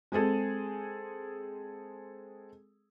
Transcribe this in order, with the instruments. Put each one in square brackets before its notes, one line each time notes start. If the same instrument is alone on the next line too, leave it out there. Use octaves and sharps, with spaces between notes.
[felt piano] G#3 C4 G#4 A4